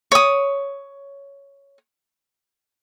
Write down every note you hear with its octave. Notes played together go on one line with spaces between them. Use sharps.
C#5 D#6